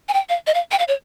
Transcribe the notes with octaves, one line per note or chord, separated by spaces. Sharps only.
G#5
G5
F5
D#5
F5
G5
F5
C#5